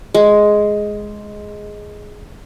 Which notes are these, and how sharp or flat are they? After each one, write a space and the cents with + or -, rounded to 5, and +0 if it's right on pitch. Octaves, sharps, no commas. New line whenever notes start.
G#3 +5